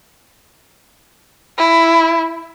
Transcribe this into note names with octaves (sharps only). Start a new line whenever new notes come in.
E4